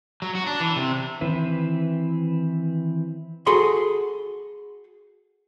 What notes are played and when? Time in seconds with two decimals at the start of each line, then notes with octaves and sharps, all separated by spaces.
0.22 F#3
0.35 F#4
0.47 D4
0.60 E3
0.76 C3
1.21 D#3 E3 C4 E4 B4
3.46 F#4 G#4 A4 B5 C6